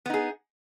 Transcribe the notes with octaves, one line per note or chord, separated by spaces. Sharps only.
B3 D#4 G#4